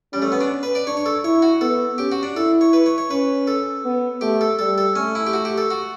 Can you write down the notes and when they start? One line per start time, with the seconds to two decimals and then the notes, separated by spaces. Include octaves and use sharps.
0.13 G3 C#4
0.22 A3
0.32 B3
0.41 D4
0.63 B4
0.75 D5
0.87 D4 C#5
0.97 C#5
1.06 A4
1.24 E4 C#5
1.42 F#4
1.61 B3 A4
1.98 C#4 G4
2.12 F#4
2.23 D4
2.36 E4 A4
2.61 C#5
2.73 B4
2.86 C#5
2.98 C#5
3.11 C#4 B4
3.47 A4
3.85 B3
4.21 A3 G4
4.41 A4
4.59 G3 A4
4.78 A4
4.96 A3 C#4
5.15 E4
5.27 G4
5.33 F#4
5.45 G4
5.58 A4
5.70 F#4